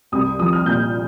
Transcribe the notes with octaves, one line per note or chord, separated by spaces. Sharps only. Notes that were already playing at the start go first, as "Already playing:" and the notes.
C2 D#6
F3 D#6
F6
A#2 G6